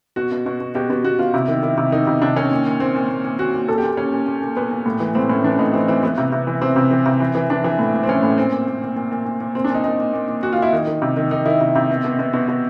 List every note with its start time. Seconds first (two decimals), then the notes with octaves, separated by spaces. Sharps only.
0.16 B2 F#4
0.32 B2
0.46 B2
0.60 B2
0.75 B2 G4
0.90 B2 F#4
1.04 B2 F#4
1.19 B2 F4
1.34 C3 E4
1.48 D#3
1.63 D#3 E4
1.78 C3
1.92 D#3 D#4
2.07 C3
2.22 C3 D4
2.36 D#3 C#4
2.51 A#2
2.66 A#2
2.80 A#2 C4
2.95 A#2
3.10 A#2
3.24 A#2
3.39 A#2 F#4
3.54 A#2
3.68 A#2 A4
3.78 G4
3.83 A#2
3.97 A#2 C#4
4.12 A#2
4.27 A#2
4.42 A#2
4.56 A#2 B3
4.71 A#2
4.86 A2
5.00 E3
5.15 A2 C4
5.29 A2 C#4
5.44 E3 D4
5.59 A2 D#4
5.74 E3 C4
5.88 E3 C4
6.03 E3 B3
6.18 C3
6.32 C3
6.47 E3
6.62 C3 C4
6.76 C3
6.91 E3
7.06 C3
7.20 E3
7.35 E3
7.50 E3 D4
7.64 E3
7.79 A2
7.94 A2
8.03 C4
8.09 E3 C#4
8.23 A2
8.38 A#2 C4
8.52 A#2
8.67 A#2
8.82 A#2
8.96 A#2
9.11 A#2
9.26 A#2
9.40 A#2
9.55 A#2 C4
9.64 D4
9.70 A#2 D#4
9.84 A#2 D#4
9.99 A#2
10.14 A#2
10.29 A#2
10.43 A#2 F#4
10.53 F4
10.57 A#2
10.62 E4
10.72 D#3 D#4
10.87 D#3
11.02 C3
11.17 D#3
11.31 D#3 D#4
11.46 D#3 E4
11.61 C3
11.75 C3
11.90 B2
12.05 B2
12.19 B2
12.33 B2
12.48 B2